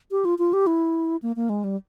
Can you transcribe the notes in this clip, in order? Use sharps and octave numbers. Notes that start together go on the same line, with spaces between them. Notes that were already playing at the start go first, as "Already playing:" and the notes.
G4
F4
F4
G4
E4
A#3
A#3
G#3
G3